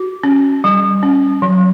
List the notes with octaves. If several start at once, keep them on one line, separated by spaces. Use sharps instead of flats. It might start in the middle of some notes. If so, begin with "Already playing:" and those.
Already playing: F#4
C#4
G3
C#4
F#3